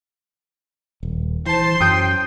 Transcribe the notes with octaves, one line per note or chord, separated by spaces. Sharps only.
D#1
E3 C5 A5 C6
F#2 F#3 G5 D#6 G6